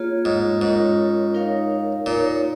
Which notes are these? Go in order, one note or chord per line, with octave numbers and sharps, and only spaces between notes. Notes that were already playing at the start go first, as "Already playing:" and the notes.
Already playing: A#3 F4 G#4 C#5
G#2
G#2 C#4 F4 A#4 C#5
D#4 A#4 C#5 F5
A#2 D#4 A#4 C#5